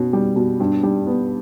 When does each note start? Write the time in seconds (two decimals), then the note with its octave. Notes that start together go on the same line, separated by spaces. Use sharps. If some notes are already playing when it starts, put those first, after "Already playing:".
Already playing: B2 C#4
0.13 G3
0.36 B2
0.60 G2
0.83 G3
1.07 B3